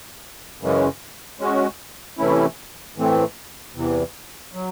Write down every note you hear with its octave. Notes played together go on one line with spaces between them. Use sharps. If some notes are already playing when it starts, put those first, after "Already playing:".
F#2 C#3 E3 G#3 C#4
G#3 C#4 F#4
C3 E3 A3 C#4 E4
A2 E3 A3 C4
E2 C3 E3
F#3